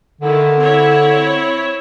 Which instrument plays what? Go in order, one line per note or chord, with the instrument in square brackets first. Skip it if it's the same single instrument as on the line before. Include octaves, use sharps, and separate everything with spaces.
[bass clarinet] D3 [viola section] D#3 E4
[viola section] C4 E4 C#5